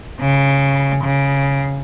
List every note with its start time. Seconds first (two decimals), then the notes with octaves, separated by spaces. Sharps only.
0.20 C#3
1.04 C#3